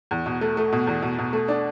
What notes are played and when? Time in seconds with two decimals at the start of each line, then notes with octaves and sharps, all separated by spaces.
0.11 E2
0.26 B2
0.41 A3
0.57 A3
0.72 B2
0.87 E2
1.02 B2
1.18 B2
1.33 A3
1.48 D4